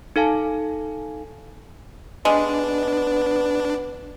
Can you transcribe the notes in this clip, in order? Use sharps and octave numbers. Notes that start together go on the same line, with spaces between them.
D#4 A4 F5 G#5 A5
G3 G#3 B3 D4